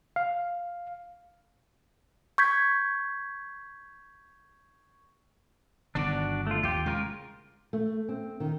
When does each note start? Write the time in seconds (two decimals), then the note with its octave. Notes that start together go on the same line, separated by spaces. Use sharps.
0.16 F5
2.38 C#6 G6 G#6 B6
5.95 G1 B2 D#3 D4 F#4 D5
6.47 A3 F4
6.63 D#2 F4 G4
6.86 C#3 G#3 F4 A#4
7.73 A3
8.09 C4
8.40 D#3